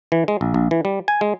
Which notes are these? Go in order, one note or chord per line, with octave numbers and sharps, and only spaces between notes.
E3
G#3
A#1
A#1
E3
G3
G#5
G#3